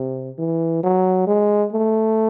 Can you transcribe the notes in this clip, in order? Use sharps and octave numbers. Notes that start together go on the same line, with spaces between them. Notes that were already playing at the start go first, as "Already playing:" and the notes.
Already playing: C3
E3
F#3
G#3
A3